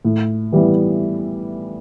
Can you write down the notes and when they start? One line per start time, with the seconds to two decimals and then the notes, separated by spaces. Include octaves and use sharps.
0.05 A2
0.52 E3 G3 B3 E4